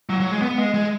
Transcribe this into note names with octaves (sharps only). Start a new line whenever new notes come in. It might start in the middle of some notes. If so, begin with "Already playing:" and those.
F#3
F#3
G#3
B3
G#3
G#3